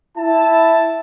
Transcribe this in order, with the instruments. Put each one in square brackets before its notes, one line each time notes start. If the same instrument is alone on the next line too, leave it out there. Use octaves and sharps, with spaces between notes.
[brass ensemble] E4 A5